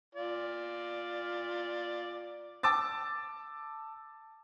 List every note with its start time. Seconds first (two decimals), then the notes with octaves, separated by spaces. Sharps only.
0.15 F4 D5
2.63 A5 D6 E6 A6